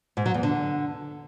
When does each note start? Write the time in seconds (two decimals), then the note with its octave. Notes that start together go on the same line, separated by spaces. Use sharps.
0.17 G#2
0.26 F#3
0.34 E2
0.43 D3